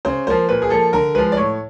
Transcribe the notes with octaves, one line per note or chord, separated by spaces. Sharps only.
C#3 C5
F3 A#3 C5
A#2 B4
G#4
F3 A#3 A4
D3 A#4
F3 G#3 B4
D5
A2 C#5